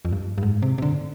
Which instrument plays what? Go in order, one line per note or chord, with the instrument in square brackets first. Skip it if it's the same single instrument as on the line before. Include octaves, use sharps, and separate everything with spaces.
[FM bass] F2
G2
G2
G#2
C3
C3
D3